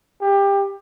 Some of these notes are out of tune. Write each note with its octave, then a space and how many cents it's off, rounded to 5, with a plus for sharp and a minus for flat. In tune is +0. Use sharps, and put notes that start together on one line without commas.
G4 +20